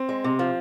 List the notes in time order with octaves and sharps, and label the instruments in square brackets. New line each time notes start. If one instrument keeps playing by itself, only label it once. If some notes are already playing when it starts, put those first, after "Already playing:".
Already playing: [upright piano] C4
[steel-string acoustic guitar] G#3
C3
F3